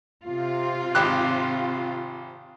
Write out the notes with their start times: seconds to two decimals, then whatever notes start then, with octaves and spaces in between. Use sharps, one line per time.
0.25 C3 F4
0.95 G#1 G4 F#6